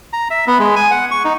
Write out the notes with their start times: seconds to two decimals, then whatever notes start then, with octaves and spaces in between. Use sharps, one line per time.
0.13 A#5
0.30 E5
0.47 B3
0.60 G#3
0.76 G#5
0.91 F#5
1.11 C#6
1.24 D#4